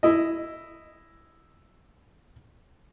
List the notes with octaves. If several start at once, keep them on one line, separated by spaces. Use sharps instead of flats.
E4 D#5